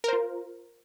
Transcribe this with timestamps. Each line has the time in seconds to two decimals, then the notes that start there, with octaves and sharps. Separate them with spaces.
0.04 A#4
0.08 C5
0.13 F4